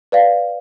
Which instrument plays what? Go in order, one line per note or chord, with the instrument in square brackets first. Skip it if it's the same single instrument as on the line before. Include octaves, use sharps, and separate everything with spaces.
[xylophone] B4 D5 F5